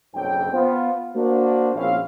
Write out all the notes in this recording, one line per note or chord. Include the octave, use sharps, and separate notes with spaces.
F#1 B1 C#3 C4 D4 G5
B3 F4 C5
A#3 D4 F#4 C5
A#1 C4 C#4 E4 G#4 F5